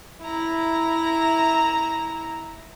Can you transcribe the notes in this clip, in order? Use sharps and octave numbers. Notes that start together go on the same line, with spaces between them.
E4 A#5